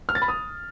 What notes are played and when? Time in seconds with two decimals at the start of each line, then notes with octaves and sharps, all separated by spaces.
0.09 F6
0.15 A6
0.22 B5
0.28 D#6